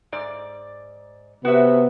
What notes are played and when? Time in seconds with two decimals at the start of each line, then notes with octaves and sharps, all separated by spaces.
0.12 G#2 D5
1.45 C3 B3 F#4 E5